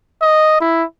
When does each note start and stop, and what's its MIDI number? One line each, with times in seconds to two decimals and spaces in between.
0.22 0.60 75
0.61 0.84 64